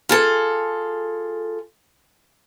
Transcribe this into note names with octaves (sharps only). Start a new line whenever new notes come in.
F4 G#4 A4